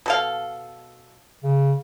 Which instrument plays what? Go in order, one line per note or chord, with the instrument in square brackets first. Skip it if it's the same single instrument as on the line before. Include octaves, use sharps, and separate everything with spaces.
[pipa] B2 A4 F5
[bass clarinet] C#3